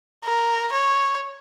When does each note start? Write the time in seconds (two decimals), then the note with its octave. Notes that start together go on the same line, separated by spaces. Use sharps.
0.24 A#4
0.73 C#5